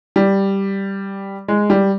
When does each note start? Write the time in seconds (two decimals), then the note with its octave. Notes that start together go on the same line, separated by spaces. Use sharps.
0.16 G3
1.48 G#3
1.70 G3